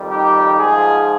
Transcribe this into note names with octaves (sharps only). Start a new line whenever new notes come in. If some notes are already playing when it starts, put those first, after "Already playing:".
Already playing: F2 D#3 G3
D#4 G4
G#2 F3 F4 G#4